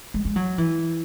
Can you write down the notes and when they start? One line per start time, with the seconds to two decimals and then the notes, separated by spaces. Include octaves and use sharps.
0.14 G#3
0.25 G#3
0.36 F#3
0.58 E3